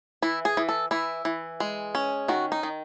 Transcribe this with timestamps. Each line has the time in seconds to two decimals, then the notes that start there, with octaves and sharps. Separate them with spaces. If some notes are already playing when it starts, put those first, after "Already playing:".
0.22 E3 E4
0.45 G#4
0.57 E3
0.68 A4
0.91 E3 E4
1.25 E3
1.60 G#3
1.95 C#4
2.28 D#3 F#4
2.52 D#4
2.63 D#3